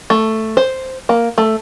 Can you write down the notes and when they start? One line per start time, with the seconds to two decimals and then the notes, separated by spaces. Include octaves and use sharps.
0.10 A3
0.57 C5
1.09 A#3
1.38 A3